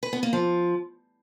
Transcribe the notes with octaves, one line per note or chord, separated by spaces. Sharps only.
B4
B3
A#3
F3